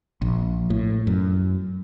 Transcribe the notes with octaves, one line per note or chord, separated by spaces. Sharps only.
A#1
A2
F#2